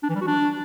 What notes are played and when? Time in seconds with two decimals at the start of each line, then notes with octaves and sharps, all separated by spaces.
0.03 D4
0.09 E3
0.15 G3
0.21 F#4
0.27 D4